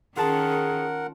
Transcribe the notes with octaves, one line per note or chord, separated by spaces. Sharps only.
D#3 C#4 F4 G#4 A#4 F#5 A5